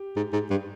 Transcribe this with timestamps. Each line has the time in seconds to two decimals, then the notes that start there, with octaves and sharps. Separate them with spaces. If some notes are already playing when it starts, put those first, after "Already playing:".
Already playing: G4
0.16 G#2
0.33 G#2
0.50 G2